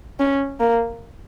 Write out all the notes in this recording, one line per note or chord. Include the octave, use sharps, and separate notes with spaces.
C#4
A#3